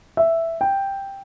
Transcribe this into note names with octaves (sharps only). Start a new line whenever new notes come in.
E5
G5